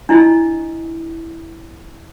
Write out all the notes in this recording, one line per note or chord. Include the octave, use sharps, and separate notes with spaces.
D4 E4 D#5